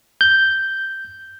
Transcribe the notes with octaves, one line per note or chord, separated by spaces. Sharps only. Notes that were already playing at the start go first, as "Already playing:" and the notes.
G6